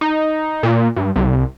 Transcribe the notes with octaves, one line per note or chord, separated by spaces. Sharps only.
D#4
A#2
G2
C2